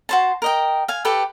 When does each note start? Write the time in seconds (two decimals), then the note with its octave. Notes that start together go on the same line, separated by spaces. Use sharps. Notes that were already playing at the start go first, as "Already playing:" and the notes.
0.09 F#4 C5 A5
0.42 A#4 D#5 G5
0.88 F5 G#5
1.05 G4 A4 B4 G5